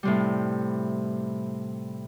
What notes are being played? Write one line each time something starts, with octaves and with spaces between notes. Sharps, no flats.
A2 C3 G3